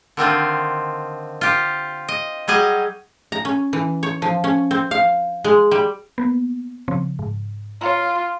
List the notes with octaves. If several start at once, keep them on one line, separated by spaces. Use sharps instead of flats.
D3 D#3 C4 F4
F4 G4
D#5
F#3 G3 G#4 D#5
A#5
C#4
E3
C#5
F3
C#4
C4
F5
G#3
G3
A#3 B3
C#3 F3 C4
G#2
F4 C#5 F5 A#5